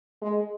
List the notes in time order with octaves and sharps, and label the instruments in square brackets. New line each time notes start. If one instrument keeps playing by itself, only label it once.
[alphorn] G#3